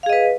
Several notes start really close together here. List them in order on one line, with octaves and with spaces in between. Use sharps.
F5 G#4 D#5 B4